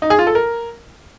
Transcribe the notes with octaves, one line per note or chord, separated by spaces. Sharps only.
D#4
G#4
F4
A4
A#4